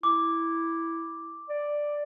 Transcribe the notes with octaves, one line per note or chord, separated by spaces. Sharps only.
E4 D6
D5